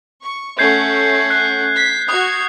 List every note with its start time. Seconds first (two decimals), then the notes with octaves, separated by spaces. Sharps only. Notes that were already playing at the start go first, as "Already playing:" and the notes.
0.22 C#6
0.59 A3 C#4 F#5 G6 G#6 C7
1.30 F#6 C7
1.75 B6
2.09 F#4 D#6 G#6